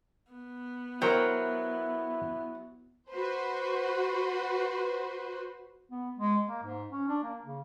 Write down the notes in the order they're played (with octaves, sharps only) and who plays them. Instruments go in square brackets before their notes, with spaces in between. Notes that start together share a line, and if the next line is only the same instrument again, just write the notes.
[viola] B3
[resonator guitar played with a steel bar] F#3 [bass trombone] E4 [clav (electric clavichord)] A#4 C5 G5
[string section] F#4 B4 C5
[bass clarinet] B3
G#3
A#3
G#2
C#4
D4
A#3
C#3